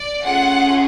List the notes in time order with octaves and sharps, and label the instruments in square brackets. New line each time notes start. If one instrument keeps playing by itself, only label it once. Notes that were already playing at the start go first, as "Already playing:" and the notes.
Already playing: [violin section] D5
A3 C#4 F4 G#4 F#5